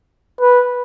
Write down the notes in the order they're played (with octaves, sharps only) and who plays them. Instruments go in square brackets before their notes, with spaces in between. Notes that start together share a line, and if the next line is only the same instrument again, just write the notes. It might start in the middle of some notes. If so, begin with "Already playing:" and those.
[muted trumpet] B4